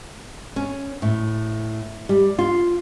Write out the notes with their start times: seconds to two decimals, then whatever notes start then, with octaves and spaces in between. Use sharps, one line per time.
0.56 C#4
1.02 A2
2.09 G3
2.39 F4